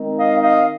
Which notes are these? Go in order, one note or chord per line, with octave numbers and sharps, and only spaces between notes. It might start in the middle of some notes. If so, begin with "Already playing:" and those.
Already playing: D#3 G#3 C4 D#4
D#5 F5
D#5 F5